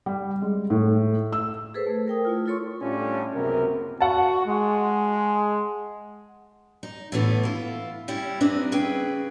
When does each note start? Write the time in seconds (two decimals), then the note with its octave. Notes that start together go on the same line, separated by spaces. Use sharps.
0.06 G3
0.42 G#3
0.70 A2
1.32 E6
1.74 G#4 A4 B4 C5
1.87 A3
2.08 A#4 G5 D#6
2.25 A3 E4 F4
2.46 E4 F4 A4 C#5 C6 C#6
2.80 A2 G3 C#4 D4 F4 G4
3.34 C#2 F#2 C3 A#3 B3 A#4
4.01 F#4 F#5 A5
4.46 G#3
6.83 D#4
7.12 A2 D3 E3 A3 B3
7.43 E4 F4
8.08 G3 C#4 E4
8.40 C4 D4 D#4 B4 D#5
8.72 C#3 G#4 B4 G5